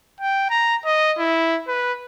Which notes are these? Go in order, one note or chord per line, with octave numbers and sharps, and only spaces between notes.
G5
A#5
D#5
E4
B4